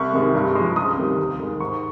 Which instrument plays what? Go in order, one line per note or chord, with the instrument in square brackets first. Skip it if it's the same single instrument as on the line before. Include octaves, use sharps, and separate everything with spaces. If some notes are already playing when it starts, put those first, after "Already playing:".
Already playing: [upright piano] C2 C#6
C3 D#3 G#3
G2
F3 G#3
C#2 D#6
C3 D#3 G3
D#2
D#3 G#3
G#2 C#6